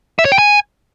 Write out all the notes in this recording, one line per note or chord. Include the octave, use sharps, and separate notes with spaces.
E5
C#5
G5
G#5